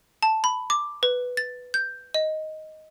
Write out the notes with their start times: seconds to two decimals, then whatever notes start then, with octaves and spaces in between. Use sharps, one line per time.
0.23 A5
0.44 B5
0.70 D6
1.03 B4
1.37 A6
1.74 G6
2.14 D#5